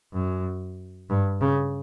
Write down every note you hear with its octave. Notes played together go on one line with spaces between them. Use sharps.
F#2
G2
C#3